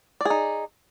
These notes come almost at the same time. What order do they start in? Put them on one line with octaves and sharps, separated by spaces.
D5 G#4 D#4